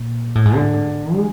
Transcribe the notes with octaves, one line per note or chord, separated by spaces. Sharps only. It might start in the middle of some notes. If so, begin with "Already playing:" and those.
Already playing: A#2
A2
G#2
D3
G#3